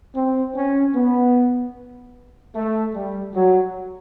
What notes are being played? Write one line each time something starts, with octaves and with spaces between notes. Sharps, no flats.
C4
C#4
B3
A3
G3
F#3